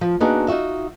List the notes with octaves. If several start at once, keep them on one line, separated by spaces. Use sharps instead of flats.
F3
A#3 B3 D4 D#4 F#4 G#4
D#4 F4 F#4 E5